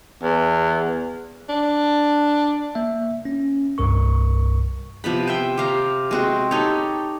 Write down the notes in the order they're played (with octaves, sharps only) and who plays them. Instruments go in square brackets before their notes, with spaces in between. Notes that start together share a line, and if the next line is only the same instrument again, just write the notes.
[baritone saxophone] E2
[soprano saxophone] D4
[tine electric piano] A#3 E5
C#4
C2 G2 A#4 C#6
[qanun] C3 F3 B3 B5
C5 E5 G5
G4 F5 A#5
G#3 C4 F#4
D#4 G4 A4 C#5